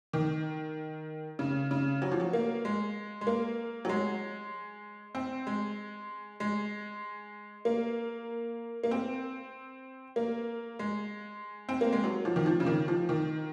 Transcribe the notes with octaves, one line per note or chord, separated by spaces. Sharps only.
D#3
C#3
C#3
F#3
F3
F#3
A#3
G#3
G#3
A#3
F#3
G#3
C4
G#3
G#3
A#3
A#3
C4
A#3
G#3
C4
A#3
G#3
F#3
F3
D#3
F3
C#3
D#3
F3
D#3